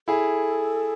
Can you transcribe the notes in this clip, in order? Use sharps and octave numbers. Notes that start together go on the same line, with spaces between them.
E4 G#4 A4